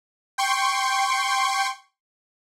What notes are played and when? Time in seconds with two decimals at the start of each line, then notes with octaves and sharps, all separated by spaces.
0.38 G5 C6 C#6